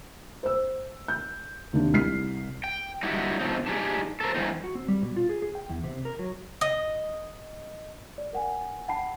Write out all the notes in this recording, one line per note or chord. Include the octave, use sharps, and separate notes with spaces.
C5 E6
G6
D#2 C3 D4
C2 F6 B6 C7
G5
D3 G3 D#4 E4 F#4 G4
B2 D3 F3 C4 D#4
D4 D#4 G4 G#4
A4 A#4 C5
G2 E3 C4 D#4
F#4
C4
G3
B2
F4
G#4
G#4
G5
E2
C3
A#4
F#3
D#5
D5
A#4 F#5 G#5
F#5 G5 A5 B5 C7